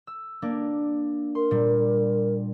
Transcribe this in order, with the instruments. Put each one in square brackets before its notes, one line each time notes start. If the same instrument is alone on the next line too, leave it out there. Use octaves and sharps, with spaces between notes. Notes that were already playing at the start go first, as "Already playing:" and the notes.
[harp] E6
A#3 D4
[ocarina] A#4 [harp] C6
[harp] A#2 G3